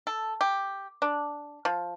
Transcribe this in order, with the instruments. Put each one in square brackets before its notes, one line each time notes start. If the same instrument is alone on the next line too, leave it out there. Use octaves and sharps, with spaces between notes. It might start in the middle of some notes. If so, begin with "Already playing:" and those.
[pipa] A4
G4
D4
F3